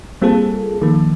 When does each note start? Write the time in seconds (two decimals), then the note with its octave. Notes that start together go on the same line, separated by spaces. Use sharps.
0.22 G3 A#3 C4 F4 G#4 A4
0.82 D#3 F3 A#3